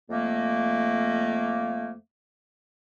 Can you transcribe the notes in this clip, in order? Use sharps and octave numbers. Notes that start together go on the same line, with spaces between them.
F2 A3 A#3